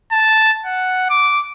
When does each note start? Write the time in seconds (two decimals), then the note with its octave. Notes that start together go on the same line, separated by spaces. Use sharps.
0.12 A5
0.65 F#5
1.10 D6